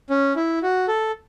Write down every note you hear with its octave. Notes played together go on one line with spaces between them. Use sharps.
C#4
E4
F#4
A4